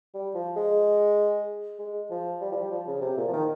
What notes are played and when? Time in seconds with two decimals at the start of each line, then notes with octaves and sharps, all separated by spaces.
0.14 G3
0.35 F3
0.56 G#3
1.79 G#3
2.10 F3
2.41 G3
2.52 F3
2.56 G3
2.71 F3
2.87 C#3
3.02 C3
3.17 A#2
3.28 F3
3.33 D#3